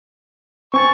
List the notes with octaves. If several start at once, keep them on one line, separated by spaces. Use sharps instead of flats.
C4 G#5 C#6 A6